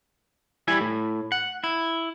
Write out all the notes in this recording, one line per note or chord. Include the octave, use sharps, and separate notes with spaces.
G3 E4 G#5
A2
F#5
E4